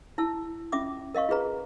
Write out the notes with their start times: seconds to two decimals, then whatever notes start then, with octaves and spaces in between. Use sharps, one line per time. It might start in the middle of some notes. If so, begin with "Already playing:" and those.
0.18 E4 A5 E6
0.72 C#4 F4 E5 D6 D#6
1.15 A#4 D#5 F5 C#6
1.29 F4 G#4 B4 A#5